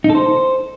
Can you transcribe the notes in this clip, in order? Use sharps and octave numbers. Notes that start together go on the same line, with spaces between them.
D#4
A4
C5